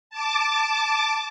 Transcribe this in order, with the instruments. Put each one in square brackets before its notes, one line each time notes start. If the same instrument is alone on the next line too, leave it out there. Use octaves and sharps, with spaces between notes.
[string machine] A5 D6